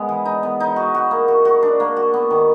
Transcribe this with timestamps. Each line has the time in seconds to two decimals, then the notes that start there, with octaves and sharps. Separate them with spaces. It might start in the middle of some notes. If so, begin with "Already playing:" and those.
Already playing: G#3 B3
0.09 E3
0.25 D#4
0.43 B3
0.60 D#4
0.76 F#4
0.94 F#4
1.11 A#3
1.28 F#4
1.45 F#4
1.63 D4
1.80 A#3
1.96 F#4
2.14 B3
2.30 D#3